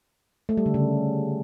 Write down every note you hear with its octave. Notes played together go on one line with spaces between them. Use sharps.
A3
G3
D3
C#3